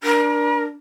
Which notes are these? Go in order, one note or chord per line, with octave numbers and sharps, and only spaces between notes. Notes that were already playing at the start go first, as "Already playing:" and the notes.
D4 A#4